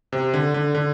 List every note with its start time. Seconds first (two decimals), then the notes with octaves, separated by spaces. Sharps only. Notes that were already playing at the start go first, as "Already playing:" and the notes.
0.12 C3
0.34 D3
0.54 D3
0.75 D3